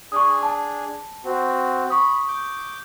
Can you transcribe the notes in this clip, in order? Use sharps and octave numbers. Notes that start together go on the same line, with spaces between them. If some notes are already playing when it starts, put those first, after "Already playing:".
D4 G#4 G#5 C#6 D#6
A5
C4 F#4
B5 C#6 D#6
D6 G6